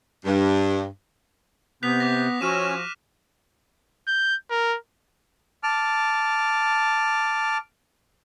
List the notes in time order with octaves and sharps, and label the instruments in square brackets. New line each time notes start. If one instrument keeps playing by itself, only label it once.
[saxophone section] G2
[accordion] C3 G6 [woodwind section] B3 [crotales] F#6 B6 F7
[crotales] D6 A#6
[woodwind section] F3 F#4 [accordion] C#4 E6 [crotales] F6 D#7 E7
[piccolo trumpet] G6
A#4
[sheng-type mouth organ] A5 D6 F6